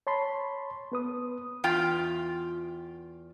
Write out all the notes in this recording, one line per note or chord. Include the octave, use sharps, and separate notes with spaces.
C#5 A5 B5 C6
B3 B4 D#6
E2 F4 G5